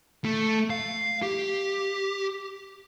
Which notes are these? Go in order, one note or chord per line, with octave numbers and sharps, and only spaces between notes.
A3
F5
G4